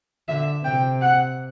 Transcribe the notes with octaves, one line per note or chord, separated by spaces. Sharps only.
D3 E5
C3 G5
F#5